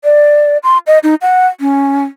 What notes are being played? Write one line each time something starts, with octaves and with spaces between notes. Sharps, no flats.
D5
C6
D#5
D#4
F#5
C#4